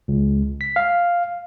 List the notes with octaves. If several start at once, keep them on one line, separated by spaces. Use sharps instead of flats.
C#2
B6
F5